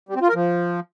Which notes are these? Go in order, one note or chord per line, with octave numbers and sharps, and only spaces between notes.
G3
C4
F4
A#4
F3